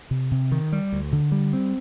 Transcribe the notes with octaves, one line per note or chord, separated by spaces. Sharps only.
C3
C3
D#3
G3
D2
D3
G3
C4